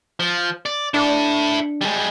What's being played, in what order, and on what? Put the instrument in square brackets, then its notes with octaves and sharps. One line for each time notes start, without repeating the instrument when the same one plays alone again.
[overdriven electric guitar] F3
D5
[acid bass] D4 [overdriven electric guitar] E4 A4
[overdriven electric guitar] G3 G#3